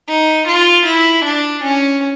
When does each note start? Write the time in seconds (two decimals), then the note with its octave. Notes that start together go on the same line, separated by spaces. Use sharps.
0.08 D#4
0.46 F4
0.85 E4
1.24 D4
1.62 C#4